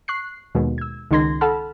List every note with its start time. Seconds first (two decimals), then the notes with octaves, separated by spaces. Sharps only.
0.08 C#6 F#6 C7
0.55 D#2 B2 G#3
0.78 E6 G#6
1.11 C#2 D#3 D#4 C6 G#6 A#6
1.41 A4 F#5 A5 B5 F6